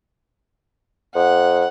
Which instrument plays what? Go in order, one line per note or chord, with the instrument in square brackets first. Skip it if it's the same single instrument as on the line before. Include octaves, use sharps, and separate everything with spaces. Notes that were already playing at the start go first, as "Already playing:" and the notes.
[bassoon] F2 [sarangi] F#5